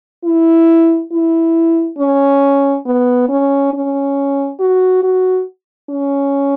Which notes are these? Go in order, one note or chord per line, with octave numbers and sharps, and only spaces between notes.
E4
E4
C#4
B3
C#4
C#4
F#4
F#4
C#4